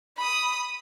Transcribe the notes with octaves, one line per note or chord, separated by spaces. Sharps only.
B5 D#6